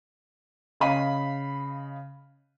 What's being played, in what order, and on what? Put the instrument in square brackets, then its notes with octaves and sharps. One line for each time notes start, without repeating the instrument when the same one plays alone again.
[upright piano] C#3 D#5 F5 B5 D#7